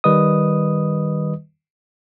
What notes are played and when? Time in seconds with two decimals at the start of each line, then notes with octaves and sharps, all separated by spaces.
0.04 D#3 G3 B4 D#5 D#6